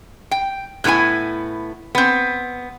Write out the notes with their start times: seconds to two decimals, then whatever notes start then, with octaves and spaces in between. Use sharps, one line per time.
0.31 G5
0.84 A2 C3 B3 E4 G#5
1.95 B3 C4